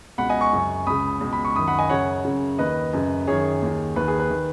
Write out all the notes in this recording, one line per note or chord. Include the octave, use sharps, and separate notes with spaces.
C#2 B2 F#5 B5
D#5 G#5
G#5 C#6
F#2 C#3
C#2 C#3 B5 D#6
C#2 B2
B5
C#6
F#2 D#3 B5 D#6
F#5 B5
D#5 G#5
F#2 C#3 C#5 F#5
F#2 C#3
D#2 D#3 B4 D#5
F#2 C#3
F#2 D#3 G#4 C#5
D#2 D#3
D#2 D#3 B4
G#4
B4
D#3